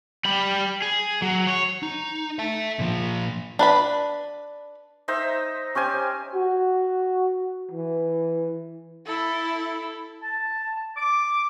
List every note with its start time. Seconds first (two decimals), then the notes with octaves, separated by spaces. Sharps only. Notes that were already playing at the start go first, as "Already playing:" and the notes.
0.25 G3 B5
0.82 G#4
1.22 F#3
1.47 C#5
1.83 D#4
2.39 E5 A5
2.79 A#2 F3
3.59 D4 B4 B5
5.08 D#4 C5 E5 A#5
5.75 C#4 G4 C5 G#5
6.34 F#4
7.71 E3
9.06 E4 A4
10.23 A5
10.97 D6